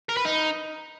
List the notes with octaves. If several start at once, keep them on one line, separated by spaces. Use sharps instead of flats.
A#4
B4
D#4